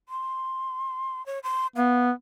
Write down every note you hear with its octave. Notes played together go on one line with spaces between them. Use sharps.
C6
C#5
C6
B3 F5